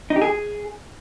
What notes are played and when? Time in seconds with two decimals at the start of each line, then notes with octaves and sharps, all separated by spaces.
0.10 D#4
0.16 G4
0.22 G#4